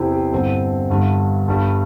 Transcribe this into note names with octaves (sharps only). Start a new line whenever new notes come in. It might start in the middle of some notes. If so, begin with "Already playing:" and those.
Already playing: E2 C3 E3 E4 G4 A4 C5
G4
G1 G2 D3 C4 E4 A4
G1 G2 D3
G1 G2 G3